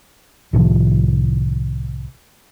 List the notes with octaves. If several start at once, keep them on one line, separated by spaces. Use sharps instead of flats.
C2 A2 D#3 F3